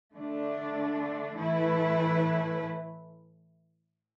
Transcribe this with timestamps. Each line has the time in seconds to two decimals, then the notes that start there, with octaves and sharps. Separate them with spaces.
0.13 D3 A3 D4
1.38 A2 E3 A3 E4 B4